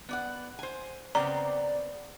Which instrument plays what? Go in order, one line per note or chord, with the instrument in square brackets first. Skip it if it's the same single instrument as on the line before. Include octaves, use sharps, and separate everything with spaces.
[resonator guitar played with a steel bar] B3 D5 F#5
C5 G#5
[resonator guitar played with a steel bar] C#3 B3 C4 [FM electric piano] D5 [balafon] A#5